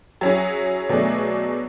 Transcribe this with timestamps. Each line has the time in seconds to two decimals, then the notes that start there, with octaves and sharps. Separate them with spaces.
0.21 F#3 C#4 E4 G#4
0.89 B2 F#3 A3 D4 G#4